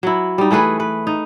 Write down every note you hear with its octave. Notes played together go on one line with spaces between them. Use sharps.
F#3 E4
G3 D#4
E3 A3 G#4 B4
B4
D#4